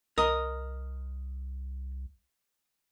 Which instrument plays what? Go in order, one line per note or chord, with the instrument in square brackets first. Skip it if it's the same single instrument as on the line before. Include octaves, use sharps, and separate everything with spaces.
[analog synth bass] C2 [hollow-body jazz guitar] A#4 D#5 A#5 [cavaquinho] D#6